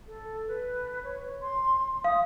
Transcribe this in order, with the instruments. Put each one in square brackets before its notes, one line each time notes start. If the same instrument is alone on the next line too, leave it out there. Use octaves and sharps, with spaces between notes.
[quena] A4
B4
C#5
C6
[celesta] F5 [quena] D#6